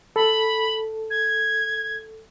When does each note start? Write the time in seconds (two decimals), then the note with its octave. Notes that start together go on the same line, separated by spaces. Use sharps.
0.16 A4 B5
1.10 G#6